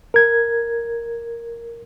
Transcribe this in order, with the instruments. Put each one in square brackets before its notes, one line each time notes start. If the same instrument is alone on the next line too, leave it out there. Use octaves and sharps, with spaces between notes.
[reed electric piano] A#4 G#6